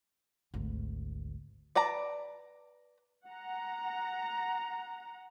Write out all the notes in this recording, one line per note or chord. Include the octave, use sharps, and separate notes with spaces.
G#1 D2
B4 D5 A5 A#5
F#5 A#5